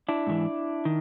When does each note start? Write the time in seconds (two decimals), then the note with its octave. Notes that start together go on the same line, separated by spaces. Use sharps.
0.09 D4 E4
0.27 G#2 E3
0.85 D#3